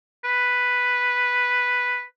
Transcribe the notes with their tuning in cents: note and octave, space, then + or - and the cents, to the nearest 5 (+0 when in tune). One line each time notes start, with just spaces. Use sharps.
B4 +0